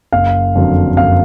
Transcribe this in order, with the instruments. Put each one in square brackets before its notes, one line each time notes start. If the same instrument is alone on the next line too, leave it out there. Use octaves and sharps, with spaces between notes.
[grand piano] F#1 F5
F2 D3 F#3
F#1 F5